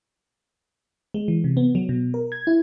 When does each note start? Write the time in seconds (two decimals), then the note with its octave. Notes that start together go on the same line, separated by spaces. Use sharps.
1.14 G#3
1.28 E3
1.44 C3
1.57 B3
1.75 F#3
1.89 B2
2.14 A#4
2.32 G#6
2.47 E4